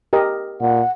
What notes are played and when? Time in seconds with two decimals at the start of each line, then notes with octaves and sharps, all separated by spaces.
0.13 G4 A#4 D#5
0.61 A#2 F#5